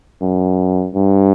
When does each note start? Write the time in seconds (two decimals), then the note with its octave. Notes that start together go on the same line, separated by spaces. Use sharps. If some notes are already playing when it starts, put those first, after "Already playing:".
0.22 F#2
0.95 G2